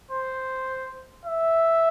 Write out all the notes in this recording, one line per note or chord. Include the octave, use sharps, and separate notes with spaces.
C5
E5